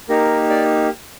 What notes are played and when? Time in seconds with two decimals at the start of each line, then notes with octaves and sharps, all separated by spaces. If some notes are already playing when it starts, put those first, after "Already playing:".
0.09 A#3 D#4 G4 A#4
0.49 D5